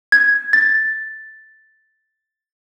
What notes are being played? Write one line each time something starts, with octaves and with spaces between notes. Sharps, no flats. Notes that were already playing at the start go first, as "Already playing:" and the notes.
G#6
A6